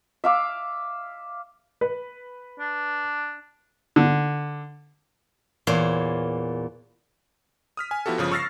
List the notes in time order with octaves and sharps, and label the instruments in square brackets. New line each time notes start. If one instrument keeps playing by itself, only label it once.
[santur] E5 F5 D6
[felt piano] B4
[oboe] D4
[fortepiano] D3
[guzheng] E2 A#2 C5 C#5
[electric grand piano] D#6 F6 B6
G#5
F3 B3 E4 F#4 G4 A4
G1 C#3 F3 D#6
C#6 E6 F6 A6 A#6 C7